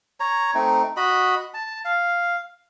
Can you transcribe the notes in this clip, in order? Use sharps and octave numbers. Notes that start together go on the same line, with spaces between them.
C#5 A#5
A3 C4 D#4
F#4 D#5 B5
A5
F5